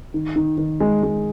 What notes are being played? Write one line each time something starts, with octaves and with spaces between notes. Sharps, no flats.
D#3
D#3
D#3
G#3
G#3